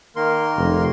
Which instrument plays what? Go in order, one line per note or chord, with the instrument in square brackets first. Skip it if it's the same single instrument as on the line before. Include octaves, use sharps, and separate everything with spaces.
[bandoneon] D#3 C6 [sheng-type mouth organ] A#3 A#4
[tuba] F1